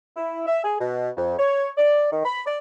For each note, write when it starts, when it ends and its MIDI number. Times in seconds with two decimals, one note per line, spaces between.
0.16 0.43 64
0.47 0.60 76
0.64 0.74 68
0.80 1.09 47
1.17 1.34 41
1.39 1.70 73
1.77 2.11 74
2.11 2.23 51
2.24 2.41 83
2.46 2.58 74